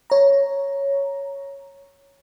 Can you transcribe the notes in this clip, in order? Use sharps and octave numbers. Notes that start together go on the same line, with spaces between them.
C#5 A#5